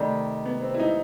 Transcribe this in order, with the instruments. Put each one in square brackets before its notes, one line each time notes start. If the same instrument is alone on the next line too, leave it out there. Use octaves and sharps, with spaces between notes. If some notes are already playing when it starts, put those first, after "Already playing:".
Already playing: [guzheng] C3 D#3 G3 [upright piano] A3
[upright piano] B3
C4
E4
D#4